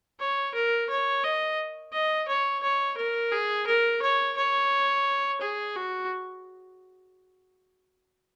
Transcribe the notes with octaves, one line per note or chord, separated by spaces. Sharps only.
C#5
A#4
C#5
D#5
D#5
C#5
C#5
A#4
G#4
A#4
C#5
C#5
G#4
F#4